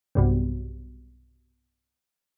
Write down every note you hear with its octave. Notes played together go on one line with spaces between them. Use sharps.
B1 G2 C3